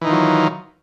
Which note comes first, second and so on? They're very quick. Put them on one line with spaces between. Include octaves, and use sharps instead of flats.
E3 D#4 D#3 F4 F#3